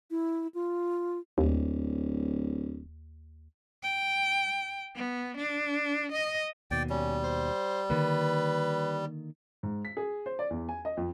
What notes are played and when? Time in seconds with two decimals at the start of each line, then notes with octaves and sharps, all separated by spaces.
0.11 E4
0.54 F4
1.38 D1 D#2
3.83 G5
4.96 B3
5.36 D4
6.11 D#5
6.71 D#2 B2 D5 G5
6.90 G3 C#4
7.23 C5
7.90 D3 D#3 A#3 B4
9.63 G#2
9.85 B6
9.97 G#4
10.26 C5
10.39 D5
10.50 E2
10.69 G#5
10.85 D#5
10.97 F2